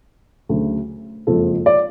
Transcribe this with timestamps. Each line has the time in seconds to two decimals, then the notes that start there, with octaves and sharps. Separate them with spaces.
0.49 D2 C#3 F#3 A3
1.27 F#1 F2 F3 G#3 A4
1.66 D5